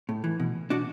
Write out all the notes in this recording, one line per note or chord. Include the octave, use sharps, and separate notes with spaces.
A2
E3
B2
B2 D4 F#4